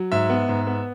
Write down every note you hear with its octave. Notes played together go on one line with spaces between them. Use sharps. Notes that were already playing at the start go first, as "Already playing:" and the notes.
Already playing: F#3
G#2 E5
B3
G#2
B3